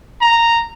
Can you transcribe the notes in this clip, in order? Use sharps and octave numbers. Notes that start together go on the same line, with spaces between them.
A#5